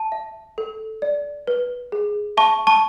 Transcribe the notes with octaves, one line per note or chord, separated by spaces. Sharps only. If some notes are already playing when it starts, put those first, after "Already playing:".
Already playing: A5
E5
A4
D5
B4
G#4
E5 A5 C#6
A5 C#6